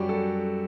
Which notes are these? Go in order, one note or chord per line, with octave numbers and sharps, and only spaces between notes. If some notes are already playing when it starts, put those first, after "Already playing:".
Already playing: F#2 G3 F#4 G4
A4